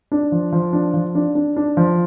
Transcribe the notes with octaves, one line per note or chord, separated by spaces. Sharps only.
D4
F3
F3
D4
F3
D4
D4
D4
F3